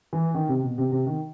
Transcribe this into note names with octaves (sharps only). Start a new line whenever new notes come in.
E3
D#3
C3
B2
C3
C3
D#3